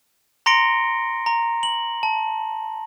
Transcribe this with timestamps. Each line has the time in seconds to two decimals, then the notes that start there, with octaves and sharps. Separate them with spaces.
0.46 A#5 C6 A#6 C#7 D7 G7
1.26 A#5
1.63 F#7
2.03 A5